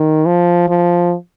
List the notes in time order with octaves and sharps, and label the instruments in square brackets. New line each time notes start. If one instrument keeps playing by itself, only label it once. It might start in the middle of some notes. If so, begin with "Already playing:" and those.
Already playing: [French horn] D#3
F3
F3